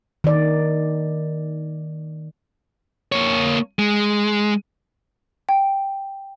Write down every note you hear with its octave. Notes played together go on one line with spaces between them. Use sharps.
D#3 D5
A#3 C#5
G#3
G5